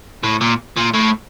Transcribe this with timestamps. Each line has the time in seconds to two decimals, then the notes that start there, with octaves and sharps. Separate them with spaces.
0.24 A2
0.41 A#2
0.76 A#2
0.93 A2